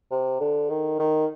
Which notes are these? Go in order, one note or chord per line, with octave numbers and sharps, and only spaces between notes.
C3
D3
D#3
D#3